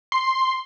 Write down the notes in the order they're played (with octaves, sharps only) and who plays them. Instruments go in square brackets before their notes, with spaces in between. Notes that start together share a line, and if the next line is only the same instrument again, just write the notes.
[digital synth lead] C6